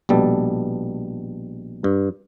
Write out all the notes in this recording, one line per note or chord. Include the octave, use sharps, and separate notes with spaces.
A#1 B2 G3 A4
G2